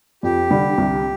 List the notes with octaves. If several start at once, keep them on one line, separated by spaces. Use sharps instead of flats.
F2 G4
D3 G3
C2